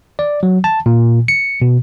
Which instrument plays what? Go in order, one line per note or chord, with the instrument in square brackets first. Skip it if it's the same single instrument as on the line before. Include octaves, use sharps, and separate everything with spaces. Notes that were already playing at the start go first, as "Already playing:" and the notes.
[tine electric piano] D5
F#3
A5
A#2
C#7
B2